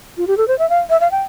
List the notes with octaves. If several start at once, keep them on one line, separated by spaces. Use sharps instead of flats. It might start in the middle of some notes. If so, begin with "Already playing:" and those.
F4
G4
A4
C5
E5
F5
E5
F5
G5